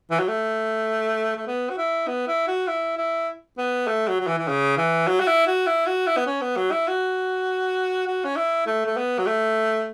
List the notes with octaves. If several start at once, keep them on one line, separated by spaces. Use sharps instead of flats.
E3
F#3
A3
A3
B3
F#4
E4
B3
E4
F#4
E4
E4
B3
A3
F#3
F#3
E3
E3
C#3
E3
F#3
F#4
E4
F#4
E4
F#4
E4
B3
C#4
B3
F#3
E4
F#4
F#4
C#4
E4
A3
A3
B3
F#3
A3